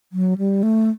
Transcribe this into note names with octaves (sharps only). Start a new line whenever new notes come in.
F#3
G3
A3